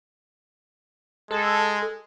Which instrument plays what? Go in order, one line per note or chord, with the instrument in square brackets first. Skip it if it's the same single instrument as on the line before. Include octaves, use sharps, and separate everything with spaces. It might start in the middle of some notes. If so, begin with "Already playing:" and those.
[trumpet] G#3 [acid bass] A4